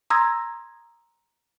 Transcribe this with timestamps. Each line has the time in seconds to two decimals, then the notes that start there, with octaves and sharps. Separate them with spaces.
0.10 A#5 C6 D#6 E6 G#6 A#6